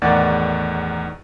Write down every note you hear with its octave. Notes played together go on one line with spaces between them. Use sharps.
E2 A2 D#3 D5 F#5 A6